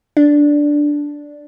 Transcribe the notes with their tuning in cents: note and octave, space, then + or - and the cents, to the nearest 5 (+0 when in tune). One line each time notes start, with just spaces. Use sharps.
D4 -5